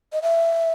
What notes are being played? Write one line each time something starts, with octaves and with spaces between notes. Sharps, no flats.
D#5
E5